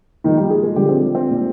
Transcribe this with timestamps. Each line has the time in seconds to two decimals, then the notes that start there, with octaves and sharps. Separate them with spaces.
0.24 A#2 D#3 F3 G#3 D#4
0.37 G3 G4
0.50 G#3 G#4
0.63 G#3 G#4
0.76 D3 F3 G3 G#3 G4
0.89 C4
1.15 C4
1.28 A#2 G#3